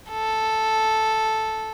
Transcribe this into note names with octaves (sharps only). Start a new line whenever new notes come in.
A4